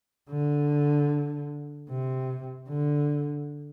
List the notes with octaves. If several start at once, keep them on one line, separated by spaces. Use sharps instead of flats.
D3
C3
D3